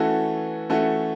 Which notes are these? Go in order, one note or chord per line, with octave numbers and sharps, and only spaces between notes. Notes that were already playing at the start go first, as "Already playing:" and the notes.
Already playing: E3 A3 C#4 F#4 A4
E3 A3 C#4 F#4 A4